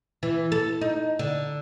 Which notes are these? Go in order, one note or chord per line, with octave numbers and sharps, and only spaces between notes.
E3
A4
D#4
D3